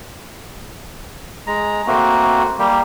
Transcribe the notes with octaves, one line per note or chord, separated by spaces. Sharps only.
G#3 A#5
A3 A#3 C4 F#4
G3 A#3 G4